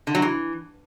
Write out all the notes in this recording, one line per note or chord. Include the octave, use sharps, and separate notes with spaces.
D3
F#3
E3